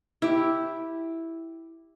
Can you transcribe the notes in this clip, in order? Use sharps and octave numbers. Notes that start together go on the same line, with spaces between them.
E4 G4